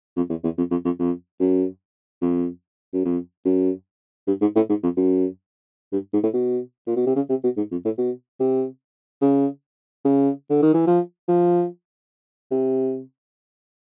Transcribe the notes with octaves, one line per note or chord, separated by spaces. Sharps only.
F2
E2
E2
F2
F2
F2
F2
F#2
F2
F#2
F2
F#2
G2
G#2
A2
G#2
F2
F#2
G2
G#2
A2
B2
A#2
B2
C3
C#3
C3
B2
G#2
F2
A2
B2
C3
C#3
C#3
D3
D#3
E3
F3
F3
C3